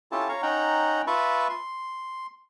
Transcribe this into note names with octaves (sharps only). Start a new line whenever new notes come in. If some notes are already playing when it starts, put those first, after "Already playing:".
C#4 E4 F4 G4 A4 A5
C#5 F5 A#5 C#6
C#4 D#4 F#5 G5 A#5
F4 B4 E5 A5 B5 C#6
C6